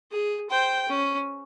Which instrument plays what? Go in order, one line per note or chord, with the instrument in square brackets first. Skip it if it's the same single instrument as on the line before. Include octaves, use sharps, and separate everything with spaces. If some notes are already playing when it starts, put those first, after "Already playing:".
[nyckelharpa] G#4
[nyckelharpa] C5 [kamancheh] G5
[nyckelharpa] C#4